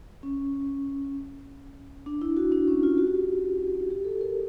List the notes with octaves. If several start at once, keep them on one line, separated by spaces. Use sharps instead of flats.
C#4
D4
E4
F#4
D4
C#4
F4
F#4
G4
F#4
G4
A4
A#4